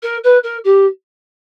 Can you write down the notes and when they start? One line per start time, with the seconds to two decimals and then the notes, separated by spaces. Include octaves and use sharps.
0.03 A#4
0.24 B4
0.43 A#4
0.64 G4